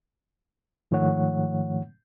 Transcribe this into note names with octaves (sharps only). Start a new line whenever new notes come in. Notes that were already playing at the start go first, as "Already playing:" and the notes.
G#2 D#3 F3 A3 C#5 F#5